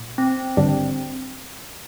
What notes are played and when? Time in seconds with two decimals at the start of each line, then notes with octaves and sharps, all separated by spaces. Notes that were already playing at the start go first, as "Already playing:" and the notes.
Already playing: A#2
0.18 C4
0.57 G#1 G2 D3 G3 D4